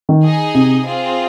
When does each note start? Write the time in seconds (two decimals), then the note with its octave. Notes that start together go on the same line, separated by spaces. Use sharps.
0.09 D#3
0.24 D#4 G#4 D#5 G#5
0.55 C3
0.85 C4 F4 G#4